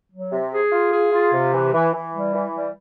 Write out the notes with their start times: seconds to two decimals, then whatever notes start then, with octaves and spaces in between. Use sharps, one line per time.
0.12 F#3
0.31 C3
0.52 G#4
0.72 F4
0.92 G#4
1.12 F4
1.33 C3
1.53 E3
1.73 E3
1.93 E3
2.13 G3
2.34 E3
2.54 G3